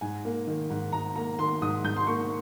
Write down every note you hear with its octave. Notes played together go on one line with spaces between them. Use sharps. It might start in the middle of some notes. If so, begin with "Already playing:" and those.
G#2 G#5
A#3
D#3
G#2
G#2 A#5
A#3 A#5
D#3 C6
G#2 D#6
G#2 G6
C6
A#3 C#6